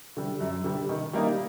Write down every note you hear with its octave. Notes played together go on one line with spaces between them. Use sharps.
D3 G3
F#2
D3 G3
D#3
G3 A#3 D#4